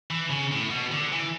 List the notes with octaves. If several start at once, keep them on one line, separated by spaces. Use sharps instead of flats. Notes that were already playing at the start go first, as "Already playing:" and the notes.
E3
C#3
A2
B2
D3
E3